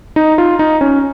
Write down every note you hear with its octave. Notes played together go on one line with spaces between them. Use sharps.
D#4
F4
D#4
C#4